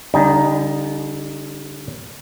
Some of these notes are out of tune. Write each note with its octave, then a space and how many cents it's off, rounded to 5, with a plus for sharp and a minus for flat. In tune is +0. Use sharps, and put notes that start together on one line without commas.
D3 -35 G3 +0 D#4 +0